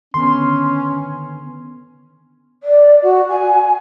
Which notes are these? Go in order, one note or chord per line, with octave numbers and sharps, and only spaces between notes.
D3 D#3 B3 C#4 C6
D5
F#4
G#5